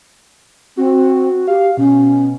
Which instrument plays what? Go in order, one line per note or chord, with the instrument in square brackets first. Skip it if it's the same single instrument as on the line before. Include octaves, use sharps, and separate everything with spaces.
[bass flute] C4 [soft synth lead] F#4
[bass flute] G4 [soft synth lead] F5
[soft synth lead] B2 [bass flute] C#4